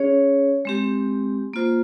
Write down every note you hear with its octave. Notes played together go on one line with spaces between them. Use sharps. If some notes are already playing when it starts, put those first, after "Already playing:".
Already playing: C#4 G#4 C#5
G#3 C4 G4
A#3 F4 C5